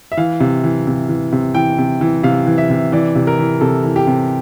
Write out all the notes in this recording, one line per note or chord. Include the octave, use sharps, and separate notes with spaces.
E5
E3 F5
C3
E3
C3
E3
C3
E3 G5
C3
E3
C3 F5
E3
E5
C3
E3 D5
C3
A#4
E3
C3 A4
E3
G4
C3